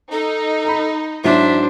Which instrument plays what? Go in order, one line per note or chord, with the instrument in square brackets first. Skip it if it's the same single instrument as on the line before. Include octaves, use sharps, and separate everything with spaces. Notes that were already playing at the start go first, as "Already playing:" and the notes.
[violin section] D#4 [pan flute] A4
[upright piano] A#5 B5
[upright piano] G#2 F#3 E4 [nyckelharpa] D4 C5 [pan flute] E5